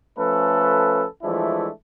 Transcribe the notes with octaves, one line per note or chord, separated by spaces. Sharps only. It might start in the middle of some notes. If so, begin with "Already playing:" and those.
F3 A3 C#4 A4 B4
E3 F3 G#3 A3 D4 E4